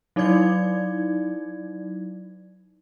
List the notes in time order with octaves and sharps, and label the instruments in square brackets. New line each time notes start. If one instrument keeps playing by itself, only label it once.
[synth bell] F#3 D#4 E4 D5 G#6